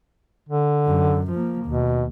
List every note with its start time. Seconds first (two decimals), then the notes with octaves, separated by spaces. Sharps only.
0.49 D3
0.87 F#2
1.31 F3 A#3
1.66 D#2 B2